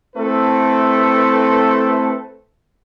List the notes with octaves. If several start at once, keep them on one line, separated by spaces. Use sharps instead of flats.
A3 C4 E4 A4 B4